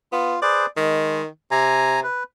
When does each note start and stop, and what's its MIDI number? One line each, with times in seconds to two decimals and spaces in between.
0.13 0.36 59
0.13 0.40 65
0.42 0.66 68
0.42 0.66 71
0.42 0.66 72
0.42 0.66 74
0.77 1.26 51
0.77 1.22 56
1.51 2.03 48
1.51 2.00 80
1.51 2.00 82
2.03 2.24 71